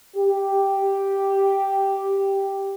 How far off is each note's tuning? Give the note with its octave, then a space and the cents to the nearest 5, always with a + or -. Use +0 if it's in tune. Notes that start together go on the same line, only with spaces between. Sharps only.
G4 +0